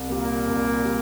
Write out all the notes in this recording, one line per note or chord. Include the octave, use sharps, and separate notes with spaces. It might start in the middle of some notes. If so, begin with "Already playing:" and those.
Already playing: C2
A#2 G3 A#3
C2
G3